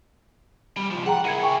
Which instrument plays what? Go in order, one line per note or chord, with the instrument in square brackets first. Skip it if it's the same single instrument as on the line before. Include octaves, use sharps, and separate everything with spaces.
[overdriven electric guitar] G3
C2 F3
[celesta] G#4 G5 A#5 [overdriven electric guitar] F#5
[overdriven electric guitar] E4 A#4 [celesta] G#6 C#7 D#7
[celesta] G5 G#5 C#6